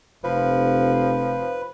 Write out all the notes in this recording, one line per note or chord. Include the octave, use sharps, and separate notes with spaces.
F1 F3 B4